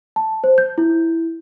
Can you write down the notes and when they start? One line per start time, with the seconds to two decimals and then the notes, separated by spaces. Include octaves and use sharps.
0.16 A5
0.44 C5
0.58 G6
0.78 E4